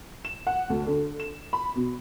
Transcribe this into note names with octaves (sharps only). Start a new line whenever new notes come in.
E7
F#5
D2
D3
E7
B5
B2